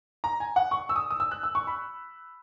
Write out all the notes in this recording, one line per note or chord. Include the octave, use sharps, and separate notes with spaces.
A#5
G#5
F#5
C#6
E6
D#6
D#6
E6
F#6
E6
C#6
B5